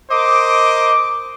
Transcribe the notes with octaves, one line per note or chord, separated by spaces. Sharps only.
A#4 C5 D#5 D6